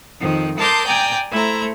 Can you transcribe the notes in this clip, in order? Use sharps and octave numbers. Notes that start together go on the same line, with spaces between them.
F2 D#3 F3
A#4 A5 C6 D6 D#6 G6
D5 G5 G#5 A#5
A3 E4 C5 A#5